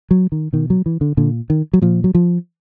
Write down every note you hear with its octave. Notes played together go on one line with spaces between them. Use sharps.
F#3
D#3
B2 D#3
F#3
E3
D3
A#2 D3
D#3
F#3
A#2 F3
F#3
F3